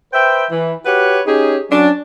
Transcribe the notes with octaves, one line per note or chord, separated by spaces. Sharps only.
B4 C5 E5 G5
E3
F#4 G4 B4 C#5 F#5
C#4 D#4 G4 G#4
F#3 C#4 D4